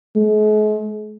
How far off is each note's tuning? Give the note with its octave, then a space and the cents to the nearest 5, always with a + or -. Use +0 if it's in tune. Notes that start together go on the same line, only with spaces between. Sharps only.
G#3 +45